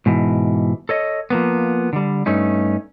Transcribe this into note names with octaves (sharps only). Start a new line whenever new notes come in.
G#2 B2 E3
A4 C#5 D#5
F3 A#3 B3
D3 G3
G2 A3 C#4 D#4